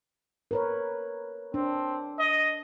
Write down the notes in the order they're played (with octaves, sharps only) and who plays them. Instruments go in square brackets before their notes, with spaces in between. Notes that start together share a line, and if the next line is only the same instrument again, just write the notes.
[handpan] A#4 B4 C#5
[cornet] C4 [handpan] D4
[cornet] D#5